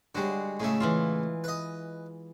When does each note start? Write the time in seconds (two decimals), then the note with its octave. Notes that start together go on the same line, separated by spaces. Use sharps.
0.15 D3 G3 G#3 F#4
0.60 A2 C#3 A3 G#4 E5
0.80 E3 E4 F4
1.44 B4 D#5